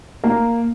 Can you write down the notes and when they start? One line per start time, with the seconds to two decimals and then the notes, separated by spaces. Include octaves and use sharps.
0.24 A#3